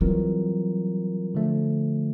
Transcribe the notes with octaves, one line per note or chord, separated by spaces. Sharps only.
E3 F#3 G3 C4 F4 A#4
D3 F3 A3